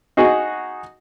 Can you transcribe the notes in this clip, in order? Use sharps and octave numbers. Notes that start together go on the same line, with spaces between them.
D#4 F#4 G#4 F#5